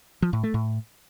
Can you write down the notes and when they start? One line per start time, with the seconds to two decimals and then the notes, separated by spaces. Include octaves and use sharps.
0.22 F3
0.33 A2
0.43 A3
0.54 A2